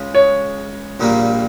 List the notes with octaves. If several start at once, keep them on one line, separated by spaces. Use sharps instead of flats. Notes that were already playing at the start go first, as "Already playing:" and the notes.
Already playing: C#2 C#3 G#3
C#5
A#1 A#2 G3 A#3